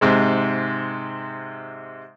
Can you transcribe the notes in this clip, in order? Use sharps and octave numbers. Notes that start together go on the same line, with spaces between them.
G#2 C3 G#3